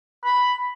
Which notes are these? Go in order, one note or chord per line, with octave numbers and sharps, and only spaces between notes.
B5